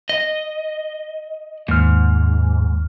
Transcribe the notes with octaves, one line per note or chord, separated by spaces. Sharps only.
D#5
D#2 G#2 F6